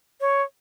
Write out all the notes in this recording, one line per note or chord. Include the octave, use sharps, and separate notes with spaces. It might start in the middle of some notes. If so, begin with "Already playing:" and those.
C#5